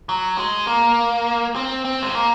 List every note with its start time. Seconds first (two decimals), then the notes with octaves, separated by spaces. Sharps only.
0.09 F#3
0.38 G#3
0.67 A#3
1.56 C4
1.85 C4
2.02 G#3
2.15 A#3